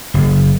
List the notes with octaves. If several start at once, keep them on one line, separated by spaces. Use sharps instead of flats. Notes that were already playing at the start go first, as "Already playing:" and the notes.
F#1